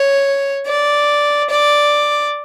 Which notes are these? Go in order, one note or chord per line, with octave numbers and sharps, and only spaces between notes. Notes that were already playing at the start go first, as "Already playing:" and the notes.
Already playing: C#5
D5
D5